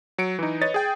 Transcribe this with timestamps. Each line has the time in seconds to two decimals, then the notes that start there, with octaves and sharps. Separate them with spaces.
0.18 F#3 C#7 D7
0.39 E3 D#4
0.61 B4 C#5 D#5 A6
0.74 G#4 G5